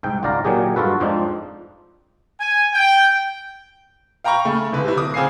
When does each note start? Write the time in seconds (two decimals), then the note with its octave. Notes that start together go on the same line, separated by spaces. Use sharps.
0.03 C2 G#2 G5
0.23 G#1 C#2 D5 F5 A#5
0.45 A#2 D#3 F#3 G4 G#4
0.76 G2 F4 F#4 A4 B4
1.00 F2 G#2 F3 C4 D4 D#4
2.40 G#5
2.74 G5
4.24 F5 G5 A#5 B5 C#6
4.45 C#3 A3
4.72 D1 C#2 B4
4.84 C3 E4
4.97 D1 D6 D#6
5.14 C#3 C4 F5 G#5 C7